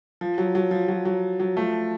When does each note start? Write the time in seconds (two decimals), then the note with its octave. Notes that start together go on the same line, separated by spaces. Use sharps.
0.21 F3
0.38 F#3
0.55 F#3
0.71 F3
0.88 F#3
1.05 F#3
1.40 F#3
1.57 F3 A3